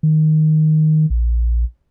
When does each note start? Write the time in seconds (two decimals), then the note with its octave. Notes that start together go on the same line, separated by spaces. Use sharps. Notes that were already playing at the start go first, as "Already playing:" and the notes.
0.03 D#3
1.10 A#1